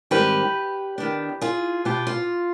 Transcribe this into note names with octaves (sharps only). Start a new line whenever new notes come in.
G#2 D#3 G3 C4 G4 B4
D#3 B3 D4
F4 G#4
B2 B3 F4 G4
F4